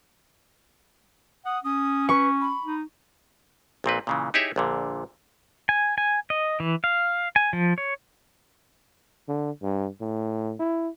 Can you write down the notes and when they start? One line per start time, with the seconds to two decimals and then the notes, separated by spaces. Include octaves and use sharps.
1.45 F#5 D#6
1.64 C#4 D#6
2.09 B4 C#6
2.41 B5
2.64 D#4
3.84 A#1 A#2 C4 B4
4.07 A#2 C#3 E3
4.34 D#4 E4 G4 G#4 C#5 E5
4.56 A#1 A#2 D3
5.69 G#5
5.98 G#5
6.30 D#5
6.60 E3
6.84 F5
7.36 G#5
7.53 F3
7.78 C#5
9.28 D3
9.63 G2
10.01 A2
10.59 E4